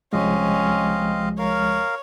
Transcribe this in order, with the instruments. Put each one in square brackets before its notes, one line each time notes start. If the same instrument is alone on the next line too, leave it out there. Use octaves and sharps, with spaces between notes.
[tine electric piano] C2 F3 G#3 [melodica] C4 D#5 F5 [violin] C#4
[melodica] A#4 F5 [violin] C#5